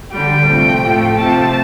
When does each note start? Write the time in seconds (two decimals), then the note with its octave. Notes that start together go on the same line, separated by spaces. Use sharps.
0.11 D3 G3 G5
0.47 C3 F3 A3
0.83 A2 F3 A3
1.18 C3 F3 A3 A5